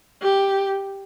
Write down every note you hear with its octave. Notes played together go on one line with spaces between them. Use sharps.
G4